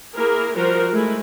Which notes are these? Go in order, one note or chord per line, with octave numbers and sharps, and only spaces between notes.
A#3 E4 G#4 A#4
F3 G3 F#4 A#4 C5
G#3 A3 E4